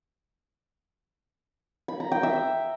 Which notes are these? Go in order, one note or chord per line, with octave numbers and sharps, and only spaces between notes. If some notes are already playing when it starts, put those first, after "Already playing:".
B5
A#5
G5
E5